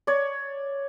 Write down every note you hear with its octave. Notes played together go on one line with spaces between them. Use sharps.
C#5 D5